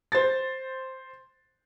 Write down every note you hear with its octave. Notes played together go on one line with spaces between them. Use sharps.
C5 A6